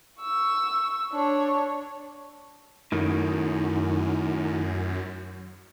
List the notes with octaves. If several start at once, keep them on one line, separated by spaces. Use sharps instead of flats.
C#6 E6
D4 C#5
F#2 A2 D#3